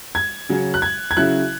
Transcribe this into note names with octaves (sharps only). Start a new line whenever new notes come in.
G#6
C#3 F#3 C#4
F#6
G#6
G#6
C#3 F#3 C#4 E4 F#6